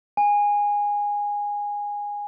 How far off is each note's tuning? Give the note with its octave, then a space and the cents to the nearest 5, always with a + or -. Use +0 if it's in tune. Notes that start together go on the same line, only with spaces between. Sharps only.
G#5 -15